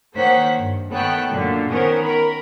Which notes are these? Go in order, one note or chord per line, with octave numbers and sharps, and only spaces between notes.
D#3 A#3 C5 C#5 F#5 B6
G2
D#3 B3 A4 C#5 G5 F#6
F#2 A#2 D3
D#3 B3 C#4 A#4 C5
A#4 B5